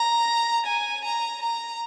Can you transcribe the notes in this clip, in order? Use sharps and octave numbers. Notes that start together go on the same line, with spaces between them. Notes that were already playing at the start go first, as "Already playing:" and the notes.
Already playing: A#5
G#5
A#5
A#5